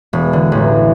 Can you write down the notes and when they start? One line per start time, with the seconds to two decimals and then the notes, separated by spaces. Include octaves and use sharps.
0.13 E1
0.33 D3
0.52 A1